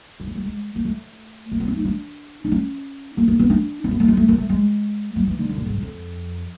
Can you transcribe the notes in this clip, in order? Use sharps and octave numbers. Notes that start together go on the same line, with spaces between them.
F3
F#3
G3
G#3
A#3
A3
A#3
B3
C4
D#4
D4
D4
C#4
A#3
A#3
B3
D4
C4
B3
A3
G#3
A3
A#3
A3
G#3
F#3
E3
D3
D3
A2
G#2
G2
F2